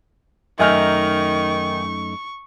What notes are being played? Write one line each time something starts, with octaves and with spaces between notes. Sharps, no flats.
F#2 D#3 A3 D#4 E5 G#5 C#6 F6